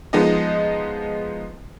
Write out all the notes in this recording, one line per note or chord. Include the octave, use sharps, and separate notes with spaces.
F3 G#3 B3 D#4 D#5